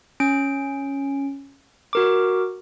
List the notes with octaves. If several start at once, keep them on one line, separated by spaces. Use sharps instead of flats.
C#4 D7
F#4 A#4 D6